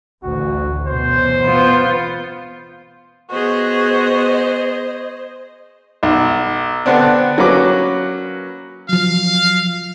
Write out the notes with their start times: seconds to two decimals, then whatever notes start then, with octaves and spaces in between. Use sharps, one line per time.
0.23 A1 D2 D3 F#4
0.87 F#2 B2 E3 C5
1.44 B3 F4
3.30 B3 F#4 G#4 C5 D#5
6.03 B1
6.86 D3 B3 C4 D4
7.38 F#3 A#3 C#4 B4 D6
8.89 F3 F#3 F5